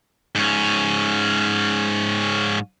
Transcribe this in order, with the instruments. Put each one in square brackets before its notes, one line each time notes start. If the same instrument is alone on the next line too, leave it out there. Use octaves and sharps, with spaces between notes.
[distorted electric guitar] G#2 C#4